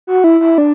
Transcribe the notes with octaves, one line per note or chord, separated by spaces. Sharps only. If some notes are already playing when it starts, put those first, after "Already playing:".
F#4
E4
E4
D4